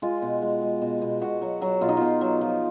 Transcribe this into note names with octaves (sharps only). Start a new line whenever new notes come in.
G#3 F4
B2
G#3
G#3
B2
B2
B2 F#4
F#3
F#3
B2 F4
D#4
B2 F4
F#3
F3